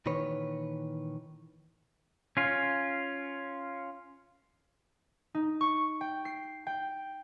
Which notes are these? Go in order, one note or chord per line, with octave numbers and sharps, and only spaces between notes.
A#2 D#3 E3 B4 C#5
C#4 F4
D#4
C#6
G5
C7
G5